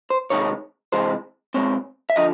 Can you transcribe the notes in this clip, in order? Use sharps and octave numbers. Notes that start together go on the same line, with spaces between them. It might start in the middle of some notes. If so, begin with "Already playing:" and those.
C5
C3 D#3 G#3 C#5
C3 E3 G#3 C5
B2 G#3 C4 C#5
E5
D3 F3 D#5